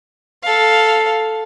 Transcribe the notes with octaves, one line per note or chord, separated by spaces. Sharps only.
A4 F5